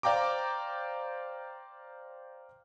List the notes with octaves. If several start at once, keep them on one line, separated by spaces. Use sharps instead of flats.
C5 D5 F5 G5 A#5 D6